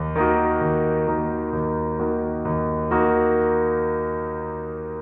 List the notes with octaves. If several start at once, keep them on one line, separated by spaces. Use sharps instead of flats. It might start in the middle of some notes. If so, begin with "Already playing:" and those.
Already playing: D#2
D#3 A#3 D#4 F#4
D#2
D#3 A#3 D#4 F#4
D#2
D#3 A#3 D#4 F#4
D#2
D#3 A#3 D#4 F#4